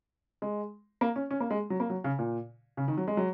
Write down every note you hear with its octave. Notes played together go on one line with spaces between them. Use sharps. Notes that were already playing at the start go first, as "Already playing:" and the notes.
G#3
A#3
C#4
C#4
A#3
G#3
F#3
A#3
F#3
C#3
A#2
C#3
D#3
F#3
G#3
F#3